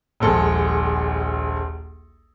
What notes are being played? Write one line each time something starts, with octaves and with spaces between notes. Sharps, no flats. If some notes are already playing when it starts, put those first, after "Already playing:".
D#1 A#1 G#3 A4